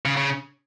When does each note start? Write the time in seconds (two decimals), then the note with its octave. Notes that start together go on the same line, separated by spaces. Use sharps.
0.05 C#3
0.17 C#3